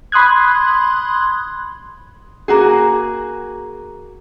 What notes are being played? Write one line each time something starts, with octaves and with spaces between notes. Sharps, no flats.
B5 C6 D#6 F#6 G#6
A#3 F#4 G#4